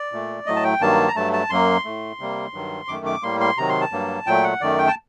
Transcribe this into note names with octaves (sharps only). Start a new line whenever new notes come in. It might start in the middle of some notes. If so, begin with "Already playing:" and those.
Already playing: D5
A#2 A3
A2 F#3 A3 D#5
A5
G5
G2 D#3 F#3 A#3 A5
A#5
G2 F#3 A3 A5
A5
F#2 F#3 A#3 C6
A2 A3
C3 G3 A#3
G2 D#3 F#3
F#2 D#3 A3 D6
D6
A2 G3 A#3 C6
C6
C3 D#3 F#3 A#5
C6
A5
G2 F#3 A#3
A#2 F#3 A3 G5
F#5
F#2 D#3 A3 D5
G5
A5